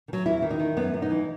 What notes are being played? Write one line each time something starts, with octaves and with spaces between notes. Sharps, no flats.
D#3
F#3
E2 E4
D#3
D#4
D#3
F#2 B3
F#2
D#4
E3